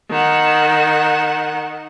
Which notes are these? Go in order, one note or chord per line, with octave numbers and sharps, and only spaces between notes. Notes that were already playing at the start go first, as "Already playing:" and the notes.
D#3 F#5